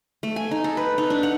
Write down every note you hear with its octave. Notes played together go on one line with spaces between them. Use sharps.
A3
G#5
D#4
A4
B4
D#4
D4
F#5